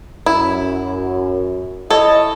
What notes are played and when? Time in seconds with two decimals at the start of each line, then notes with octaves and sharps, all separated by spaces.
0.26 F#2 E4
1.90 E4 A4 C#5 D#5